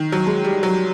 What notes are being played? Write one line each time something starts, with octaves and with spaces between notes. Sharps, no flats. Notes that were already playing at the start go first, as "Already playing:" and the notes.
Already playing: D#3
F#3
G#3
G3
F#3